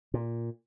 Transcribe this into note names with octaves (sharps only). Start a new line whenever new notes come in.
A#2